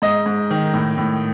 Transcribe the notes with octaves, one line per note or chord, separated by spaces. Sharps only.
G#2 D#5
G#2
D#3
A2
A2